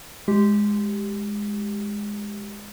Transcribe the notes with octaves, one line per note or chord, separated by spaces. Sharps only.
G#3 G4